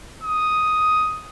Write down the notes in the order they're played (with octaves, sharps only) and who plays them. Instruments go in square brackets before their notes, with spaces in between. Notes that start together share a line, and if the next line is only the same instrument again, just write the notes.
[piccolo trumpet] D#6